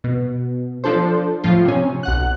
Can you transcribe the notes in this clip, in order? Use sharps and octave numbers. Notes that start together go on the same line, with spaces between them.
B2
F3 D4 A4 C5
A2 F3 F4
C3 C#4
B1 F#5 F#6